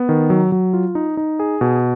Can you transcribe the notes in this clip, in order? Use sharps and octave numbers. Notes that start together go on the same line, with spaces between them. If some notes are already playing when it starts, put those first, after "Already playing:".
Already playing: B3
D#3
F#3
F#3
F4
D#4
D#4
G#4
B2